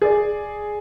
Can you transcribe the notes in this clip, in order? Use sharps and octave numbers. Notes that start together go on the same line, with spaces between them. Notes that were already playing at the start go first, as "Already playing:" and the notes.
G#4 D5